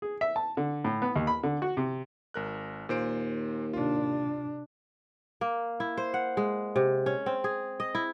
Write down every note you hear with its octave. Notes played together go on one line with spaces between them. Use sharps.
G#4
E5
A5
D3
A2
B3
D#2
B5
D3
F#4
C3
G#1 A#4 F#6
D#2 A#2 C5 D7
C3 D4 F4
A#3
E4
C5
F#5
G#3
C3
C#4
C4
G#4
D#5
E4